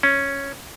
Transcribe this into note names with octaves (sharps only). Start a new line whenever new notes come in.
C#4